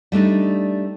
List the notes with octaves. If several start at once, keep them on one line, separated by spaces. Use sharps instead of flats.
G3 A3 D4 D#4